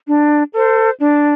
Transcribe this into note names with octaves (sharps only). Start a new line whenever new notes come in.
D4
A4 C5
D4